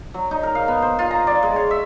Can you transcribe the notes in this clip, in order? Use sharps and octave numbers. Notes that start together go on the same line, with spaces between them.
F#3
D#4
A#4
F5
B3
C5
F4
A#5
D5
G#3
C#5
E5